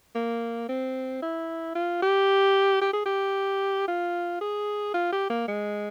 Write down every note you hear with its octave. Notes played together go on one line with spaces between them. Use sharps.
A#3
C4
E4
F4
G4
G4
G#4
G4
F4
G#4
F4
G4
A#3
G#3